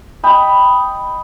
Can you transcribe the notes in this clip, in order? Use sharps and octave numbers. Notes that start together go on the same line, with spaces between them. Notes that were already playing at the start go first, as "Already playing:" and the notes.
D#5 G5 B5